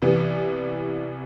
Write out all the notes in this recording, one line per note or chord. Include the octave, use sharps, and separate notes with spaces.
C2 C3 E3 B3